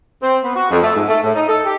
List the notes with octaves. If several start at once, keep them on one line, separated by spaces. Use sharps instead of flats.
C4
B3
F#4
F2
A3
G#2
A3
A2
D#4
A4
G4